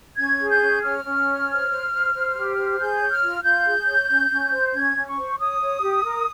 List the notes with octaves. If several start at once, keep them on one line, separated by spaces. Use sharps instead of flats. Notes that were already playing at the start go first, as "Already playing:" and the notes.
C#4 G#6
G#4
G6
C#4
C#4 F6
C#4
C#5
C5
C5
C5
C5
G4
C5
G#4 G6
C#5
F6
F4
F4 G6
G#4
C#5
C#4
C#4
C5
C#4 G#6
C#4
C#6
C5
C#5 D#6
C#5
G4
A#4